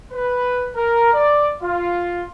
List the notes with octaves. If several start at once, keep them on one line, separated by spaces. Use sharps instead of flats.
B4
A#4
D5
F4